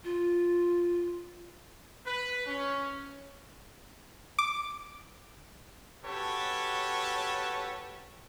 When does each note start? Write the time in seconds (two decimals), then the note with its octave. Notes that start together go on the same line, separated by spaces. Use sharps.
0.04 F4
2.06 B4
2.46 C#4
4.39 D6
6.05 C#4 F#4 G4 A4 B4 C#5